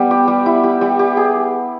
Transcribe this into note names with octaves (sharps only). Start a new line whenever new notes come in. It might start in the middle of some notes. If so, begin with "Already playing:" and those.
Already playing: G3 B3
G4
G3
E4
G4
G3
G4
G#4